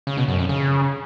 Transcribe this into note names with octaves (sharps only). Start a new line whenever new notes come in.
C#3
B2
F#2
F2
C#3